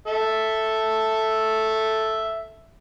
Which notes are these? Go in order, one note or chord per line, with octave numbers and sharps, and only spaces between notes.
A4 E5